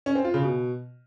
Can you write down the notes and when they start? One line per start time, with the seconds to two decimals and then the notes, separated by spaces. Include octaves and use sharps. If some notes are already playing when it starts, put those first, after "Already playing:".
0.06 C#4
0.15 C4
0.25 F4
0.34 C#3
0.43 B2